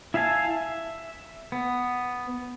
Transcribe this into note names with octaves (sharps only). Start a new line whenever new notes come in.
E4 E5 F5 G#5 A5
E5
B3